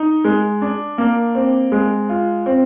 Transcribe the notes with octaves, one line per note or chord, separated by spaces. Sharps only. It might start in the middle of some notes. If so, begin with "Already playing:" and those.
Already playing: D#4
G#3
D4
A#3
C4
G#3
F4
C4